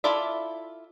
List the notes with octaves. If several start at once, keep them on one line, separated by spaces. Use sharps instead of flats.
E4 F4 A4 D5 E5